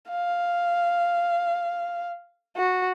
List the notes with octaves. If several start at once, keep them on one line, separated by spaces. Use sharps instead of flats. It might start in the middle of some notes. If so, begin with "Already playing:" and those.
F5
F#4